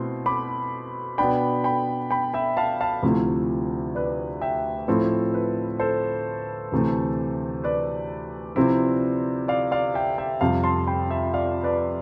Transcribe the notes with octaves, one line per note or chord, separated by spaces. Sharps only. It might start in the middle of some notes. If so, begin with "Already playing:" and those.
Already playing: B2 A3 C4 E4 C6
B5 D6
B2 B3 D4 G5 B5
G5 B5
G5 B5
E5 G5
F5 A5
F5 A5
D2 C3 F3 A3 E4
B4 D5
E5 G5
A2 F3 C4 E4 A4
B4
A4 C5
D2 C3 E3 A3
B4 D5
C3 F3 C4 E4
D5 F5
D5 F5
E5 G5
E5 G5
F2 C3 G3 F5 A5
A5 C6
G5 B5
E5 G5
D5 F5
B4 D5